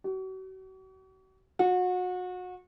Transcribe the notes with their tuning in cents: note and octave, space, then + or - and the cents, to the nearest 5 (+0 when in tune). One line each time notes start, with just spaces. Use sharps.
F#4 +40
F#4 -30